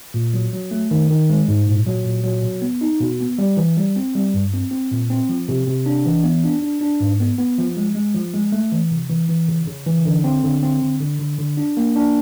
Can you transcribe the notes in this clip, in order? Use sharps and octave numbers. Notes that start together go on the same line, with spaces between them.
A#2
F#3
F#3
A3
D#3
D#3
G#3
G#2
A#2
F#3
A#2
F#3
B2
B3
D#4
B2
B3
G3
E3
G3
C4
G3
G2
C4
C4
A#2
C4
F3
C3
C3
D4
E3
B3
D4
D4
D4
G#2
B3
B3
F3
G#3
G#3
F3
G#3
A3
E3
C3
E3
E3
C#3
C#3
E3
D3
C4
D3
C4
D3
D3
D3
D3
D4
A#3
D4